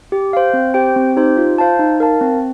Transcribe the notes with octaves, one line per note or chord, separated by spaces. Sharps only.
G4
C5 F5
C4
G4 C5 G5
C4
D#4 G4 C5
F4
C5 F5 A5
D#4
A#4 F5 A5
C4